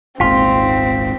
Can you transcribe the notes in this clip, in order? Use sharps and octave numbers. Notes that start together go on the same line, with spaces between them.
D#1 G#1 G#2 C4 F4 B6